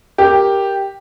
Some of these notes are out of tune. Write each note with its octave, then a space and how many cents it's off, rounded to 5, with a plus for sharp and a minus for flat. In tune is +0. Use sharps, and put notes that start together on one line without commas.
G4 +0 A#4 +0